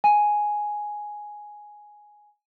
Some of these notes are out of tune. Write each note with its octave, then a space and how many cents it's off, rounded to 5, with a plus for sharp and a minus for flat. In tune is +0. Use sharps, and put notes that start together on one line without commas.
G#5 +5